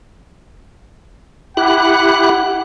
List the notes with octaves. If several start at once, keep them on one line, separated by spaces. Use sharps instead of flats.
E4 G4 F#5 F#6